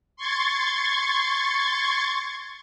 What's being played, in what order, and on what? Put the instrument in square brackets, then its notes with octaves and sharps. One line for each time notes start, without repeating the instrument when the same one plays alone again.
[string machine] C6 C#6 G#6 A6